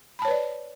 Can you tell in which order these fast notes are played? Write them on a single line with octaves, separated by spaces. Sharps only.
B5 A5 C#5 B4 D5